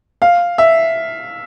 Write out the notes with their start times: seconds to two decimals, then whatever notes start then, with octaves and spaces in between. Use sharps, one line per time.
0.22 F5
0.58 E5